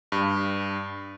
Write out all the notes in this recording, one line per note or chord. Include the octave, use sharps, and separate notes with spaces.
G2